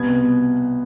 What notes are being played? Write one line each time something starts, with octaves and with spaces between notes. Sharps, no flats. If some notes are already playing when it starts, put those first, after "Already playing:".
Already playing: C2 B2 B3 G#6